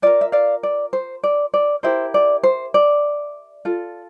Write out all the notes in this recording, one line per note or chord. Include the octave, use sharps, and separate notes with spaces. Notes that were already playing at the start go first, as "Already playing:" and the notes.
F4 A#4 D5
E5
D5 F5
D5
C5
D5
D5
E4 G4 A#4 C5 E5
D5
C5
D5
F4 A4